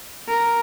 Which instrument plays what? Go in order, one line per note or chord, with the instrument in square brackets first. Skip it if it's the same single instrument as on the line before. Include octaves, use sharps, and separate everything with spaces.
[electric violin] A#4